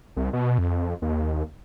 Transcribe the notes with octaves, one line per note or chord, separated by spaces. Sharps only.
C2
B2
F2
D#2